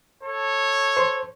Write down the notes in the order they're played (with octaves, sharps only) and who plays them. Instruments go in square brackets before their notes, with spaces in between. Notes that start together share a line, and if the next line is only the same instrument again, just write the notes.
[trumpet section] A4 C#5
[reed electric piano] C5